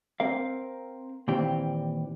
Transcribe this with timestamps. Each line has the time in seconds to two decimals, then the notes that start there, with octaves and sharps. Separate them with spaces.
0.20 C4 A#4 F5
1.28 A#2 D#3 E3 C4 G4